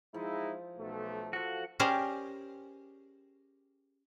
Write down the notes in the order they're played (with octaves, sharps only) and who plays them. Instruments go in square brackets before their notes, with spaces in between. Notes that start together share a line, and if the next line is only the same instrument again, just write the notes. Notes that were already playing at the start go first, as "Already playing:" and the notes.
[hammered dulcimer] F3 [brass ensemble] G#3 D#4 E4
[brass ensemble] B1 A3
[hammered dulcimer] F3 A4 [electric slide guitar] F#4
[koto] C#4 G4 G#4 A#4 C5 D5